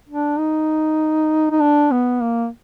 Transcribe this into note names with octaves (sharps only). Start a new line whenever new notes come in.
D4
D#4
D#4
D4
B3
A#3